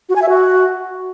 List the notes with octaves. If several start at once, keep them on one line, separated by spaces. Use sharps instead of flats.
F#4
G#5
E5
F#4